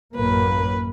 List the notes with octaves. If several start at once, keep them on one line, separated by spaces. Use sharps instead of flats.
A1 F#2 A#3 B4